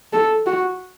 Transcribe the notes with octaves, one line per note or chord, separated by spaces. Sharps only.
A4
F#4